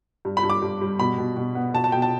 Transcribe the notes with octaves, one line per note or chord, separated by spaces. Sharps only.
G2
B5
G2
D6
G2
G3
B2 B5
B2
B2
B3
B2 A5
A5
B2 G5
A5